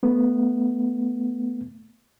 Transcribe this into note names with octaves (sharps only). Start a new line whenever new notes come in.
A3 B3